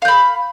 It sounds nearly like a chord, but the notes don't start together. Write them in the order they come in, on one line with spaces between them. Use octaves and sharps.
F5 G6 B5